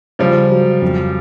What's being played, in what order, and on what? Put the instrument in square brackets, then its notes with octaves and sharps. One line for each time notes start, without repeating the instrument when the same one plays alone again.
[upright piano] C#3 [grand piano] F3 G3
[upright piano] F#3
F2